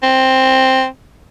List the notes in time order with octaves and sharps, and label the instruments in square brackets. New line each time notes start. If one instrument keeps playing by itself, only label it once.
[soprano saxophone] C4